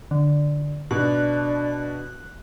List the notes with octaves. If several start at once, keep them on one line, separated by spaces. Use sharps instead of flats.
D3
B2 D4 F#6